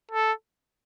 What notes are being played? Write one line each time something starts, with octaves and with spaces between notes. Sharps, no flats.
A4